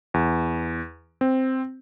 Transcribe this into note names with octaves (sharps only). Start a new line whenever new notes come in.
E2
C4